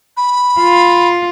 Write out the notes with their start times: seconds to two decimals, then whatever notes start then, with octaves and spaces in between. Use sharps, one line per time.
0.17 B5
0.60 F4